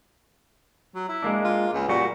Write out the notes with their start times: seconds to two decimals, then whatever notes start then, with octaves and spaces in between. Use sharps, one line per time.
0.95 F#3
1.09 E4
1.22 G#3 A#3 D4
1.44 F4
1.73 C#2
1.89 A#2 G3 F#4